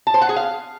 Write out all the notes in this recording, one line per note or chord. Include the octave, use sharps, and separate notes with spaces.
A5
C5
F#5
G#4
F5